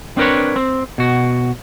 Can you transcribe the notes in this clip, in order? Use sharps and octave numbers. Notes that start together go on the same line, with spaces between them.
C4 D4 A#4 B4 C#5
C4
B2 F#4